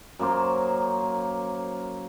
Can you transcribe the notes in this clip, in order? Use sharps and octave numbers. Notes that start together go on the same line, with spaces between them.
F#2 A#3 C5